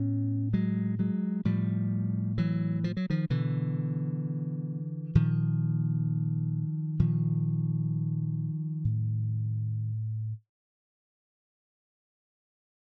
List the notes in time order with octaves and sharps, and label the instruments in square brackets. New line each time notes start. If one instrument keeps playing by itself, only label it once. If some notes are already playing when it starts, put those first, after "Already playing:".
Already playing: [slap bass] A2 B3 C#4
F#3 G#3
F#3 G#3
A2 F3 G3
E3 F#3
F3
F#3
D#3 F3
B2 D3 E3
A#2 D#3 F3
A#2 D#3 F3
A2